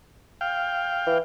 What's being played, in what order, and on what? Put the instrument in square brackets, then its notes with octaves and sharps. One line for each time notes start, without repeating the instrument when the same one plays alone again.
[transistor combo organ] F5 G5
[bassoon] E3